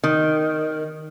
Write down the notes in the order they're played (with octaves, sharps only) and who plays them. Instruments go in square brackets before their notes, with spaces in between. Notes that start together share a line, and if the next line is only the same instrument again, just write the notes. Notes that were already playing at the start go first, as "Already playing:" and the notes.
[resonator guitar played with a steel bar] D#3